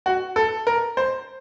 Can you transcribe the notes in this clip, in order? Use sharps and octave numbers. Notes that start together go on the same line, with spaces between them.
F#4
A4
A#4
C5